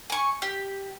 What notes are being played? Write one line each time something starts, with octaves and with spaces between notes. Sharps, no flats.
G#5 C#6
G4